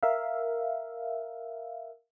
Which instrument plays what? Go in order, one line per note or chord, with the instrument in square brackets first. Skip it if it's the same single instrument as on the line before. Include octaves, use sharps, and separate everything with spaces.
[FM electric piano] A#4 E5 F5